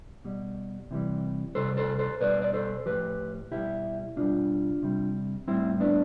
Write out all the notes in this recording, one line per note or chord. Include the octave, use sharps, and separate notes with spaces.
B2 G3
C3 E3 G3
C3 G3 A4 C5
A4 C5
A4 C5
B2 G3 B4 D5
D5
A4 C5
A2 F3 G4 B4
B2 G3 E4 G4
B2 G3 D4 F4
C3 G3
A2 G3 C4 E4
B3 D4